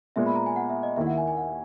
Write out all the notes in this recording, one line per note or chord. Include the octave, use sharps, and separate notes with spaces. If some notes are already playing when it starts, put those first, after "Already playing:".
A#2 G#3 B3 E5
B5
A#5
G#5
F#5
E5
D#5
D#2 D#3 A#3 E4 E5
F#5
G#5
G#5
F#5